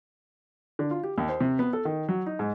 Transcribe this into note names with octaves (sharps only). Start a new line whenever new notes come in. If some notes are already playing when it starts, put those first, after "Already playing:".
D3
F4
G4
D#2
C5
C3
B3
A4
D#3
F#3
D#4
G#2